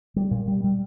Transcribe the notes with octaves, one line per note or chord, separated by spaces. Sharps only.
G3
A#2
G3
G3